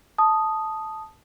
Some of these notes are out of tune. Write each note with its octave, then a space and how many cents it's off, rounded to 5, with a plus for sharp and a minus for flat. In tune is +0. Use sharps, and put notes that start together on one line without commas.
A5 -5 D#6 +0